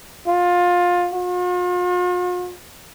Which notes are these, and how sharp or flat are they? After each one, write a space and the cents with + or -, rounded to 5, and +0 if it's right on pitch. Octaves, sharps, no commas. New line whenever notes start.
F4 +20
F4 +45